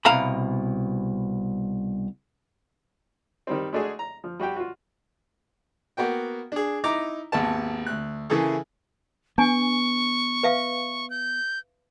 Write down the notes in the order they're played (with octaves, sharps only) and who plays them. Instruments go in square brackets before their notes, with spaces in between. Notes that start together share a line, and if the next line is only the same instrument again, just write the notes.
[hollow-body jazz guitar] C2 B2 F5 A#5 B5
[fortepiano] D#3 G3 C4
G#3 A3 D4 F#4 G#4
A#5
F3
G3 F#4 G4 G5
F4 F#4
A#3 B3 F#4 G5
D4 G#4
D#4 E4 A#5 D6
G#1 D#2 B3 A5
D2 F#6
C#3 E3 A#3 E4 G#4 A4
[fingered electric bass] B3 [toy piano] D4 G#5 [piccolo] C#6
[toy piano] B4 E5 F5
[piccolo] G6